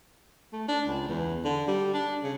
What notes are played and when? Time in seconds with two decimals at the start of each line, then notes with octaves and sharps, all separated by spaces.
0.53 A3
0.68 D4
0.87 C#2
1.08 E2
1.45 D3
1.68 G3
1.94 D4
2.24 C#3